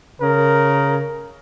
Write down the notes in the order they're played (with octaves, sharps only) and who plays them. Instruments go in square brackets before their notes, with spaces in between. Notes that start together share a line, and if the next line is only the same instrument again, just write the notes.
[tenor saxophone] C#3 [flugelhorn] A#4